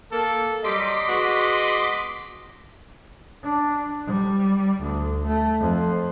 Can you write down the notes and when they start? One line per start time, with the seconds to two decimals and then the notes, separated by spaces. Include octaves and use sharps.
0.12 A#3 A4
0.64 F#3 G3 D#5 C6 D6 B6
1.08 G#3 B3 F#4
3.44 D4
4.07 G3
4.81 D2
5.27 A3
5.60 F2